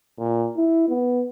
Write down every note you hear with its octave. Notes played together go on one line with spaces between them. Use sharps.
A#2
E4
B3